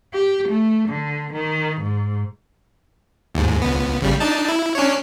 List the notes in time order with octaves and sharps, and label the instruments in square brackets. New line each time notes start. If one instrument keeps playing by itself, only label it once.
[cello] G4
A3
D3
D#3
G#2
[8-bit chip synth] D#2 G#2
C#2 B3
A1 C#3 G3
D4 D#4 A5
E4
C#4 D4 C#5